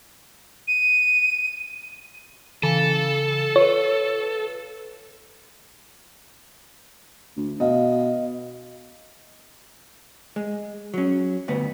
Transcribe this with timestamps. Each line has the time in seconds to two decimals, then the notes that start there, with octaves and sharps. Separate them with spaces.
0.68 D#7
2.63 C#3 E3 A4
3.56 F4 B4 C#5
7.37 D2
7.60 B2 D#5 F5
10.36 G#3
10.94 F#3 C#4
11.48 D2 G2 B3